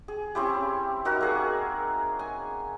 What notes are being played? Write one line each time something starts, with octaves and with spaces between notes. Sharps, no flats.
G#4
C4 C#4 E4 G4
D#4 F#4 A#4 E5
A#3 G#4 F#5
G#5